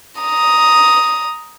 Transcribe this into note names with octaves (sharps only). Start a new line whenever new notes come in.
A#5 D#6